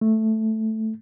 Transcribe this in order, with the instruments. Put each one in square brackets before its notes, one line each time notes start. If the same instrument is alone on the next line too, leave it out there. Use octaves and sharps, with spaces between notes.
[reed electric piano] A3